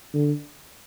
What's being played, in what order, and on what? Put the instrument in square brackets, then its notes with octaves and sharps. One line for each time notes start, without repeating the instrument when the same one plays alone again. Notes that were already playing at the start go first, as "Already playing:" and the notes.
[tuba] D3